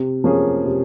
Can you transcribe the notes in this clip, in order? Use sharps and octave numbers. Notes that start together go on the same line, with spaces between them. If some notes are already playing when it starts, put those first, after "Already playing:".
Already playing: C3
F3 A#3 C#4 G#4
C3